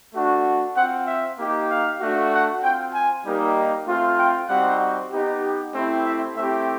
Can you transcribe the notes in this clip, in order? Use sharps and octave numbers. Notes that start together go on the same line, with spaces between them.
A3 D4 F#4
C4 F4 F#5
E5
A#3 D#4 G4
F5
A3 D4 F#4
F#5
C4 F4 G5
G#5
G3 A#3 D#4 G4
A3 C4 F4
G5
G3 C4 D#4 F#4 F#5
B3 D#4 G4
A3 C4 E4 G4
E5
A3 C4 E4 G4 E5